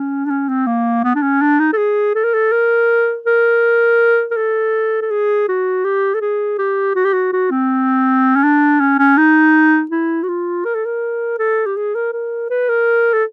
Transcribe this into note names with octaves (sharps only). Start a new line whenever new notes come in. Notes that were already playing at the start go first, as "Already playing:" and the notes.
Already playing: C#4
D4
C#4
C4
A#3
B3
D4
C#4
D4
D#4
A4
G#4
A4
A#4
A4
A#4
A#4
A#4
A4
A4
G#4
F#4
G4
A4
G#4
G4
F#4
G4
F#4
F#4
C4
C#4
D4
C#4
C#4
D#4
E4
F#4
F4
A#4
A4
A#4
A4
G4
G#4
A#4
A#4
B4
A#4
A4